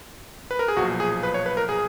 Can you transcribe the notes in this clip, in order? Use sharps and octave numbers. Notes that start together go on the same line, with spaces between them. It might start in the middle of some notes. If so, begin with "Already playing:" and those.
B4
A#4
G#4
B1 A#2 F3 F#4
G#4
B4
C#5
B4
A#4
G#4